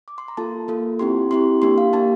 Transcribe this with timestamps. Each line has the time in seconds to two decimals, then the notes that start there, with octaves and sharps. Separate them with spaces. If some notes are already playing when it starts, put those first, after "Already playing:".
0.08 D6
0.18 C6
0.28 A#5
0.37 A#3 F4 A4 A5
0.68 A#3 F4 A4
0.99 C4 E4 G4 C6
1.31 C4 E4 G4 C6
1.62 A#3 D4 G4 C6
1.78 F5
1.93 A#3 D4 G4 A5